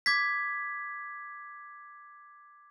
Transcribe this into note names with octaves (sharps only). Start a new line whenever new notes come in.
D6 G#6 B6